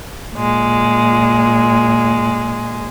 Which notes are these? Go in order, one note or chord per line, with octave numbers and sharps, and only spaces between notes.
A#2 G#3